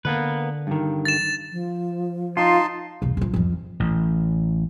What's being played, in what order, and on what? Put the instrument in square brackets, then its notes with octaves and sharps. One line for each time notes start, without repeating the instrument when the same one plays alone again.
[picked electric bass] D3 [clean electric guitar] A#3 B3 B4
[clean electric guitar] G2 D#3
[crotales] A6 E7
[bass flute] F3
[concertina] D#4 A5 C6 [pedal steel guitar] F4
[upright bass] B1 E2
A#1 F3
F2 F3
[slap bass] A1